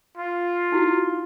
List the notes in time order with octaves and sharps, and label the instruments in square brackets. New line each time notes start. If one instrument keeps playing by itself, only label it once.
[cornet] F4
[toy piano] D#4 E4 F#4